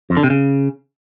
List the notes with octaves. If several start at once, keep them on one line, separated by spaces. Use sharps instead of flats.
F2
D3
C3
C#3